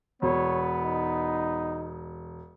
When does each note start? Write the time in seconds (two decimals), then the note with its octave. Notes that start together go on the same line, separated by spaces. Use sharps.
0.22 E1 B3 C#5
0.84 D#4